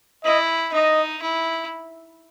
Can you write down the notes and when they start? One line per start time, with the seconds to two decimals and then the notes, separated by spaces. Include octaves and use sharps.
0.25 E4 D#5
0.73 D#4 D#5
1.22 E4